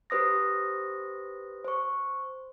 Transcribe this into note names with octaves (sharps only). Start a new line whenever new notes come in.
G4 B4 C5 D#6 A#6
C5 C#6